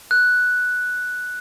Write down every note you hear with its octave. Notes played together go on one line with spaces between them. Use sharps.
F#6